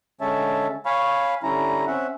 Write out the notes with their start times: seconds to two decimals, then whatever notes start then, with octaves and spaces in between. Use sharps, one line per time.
0.21 D3 G#3 C#4 C#5 E5 A5
0.86 C#5 F5 G#5 B5 C#6
1.43 D3 G3 C#4 E4 A#5
1.87 C4 C#4 E5 F#5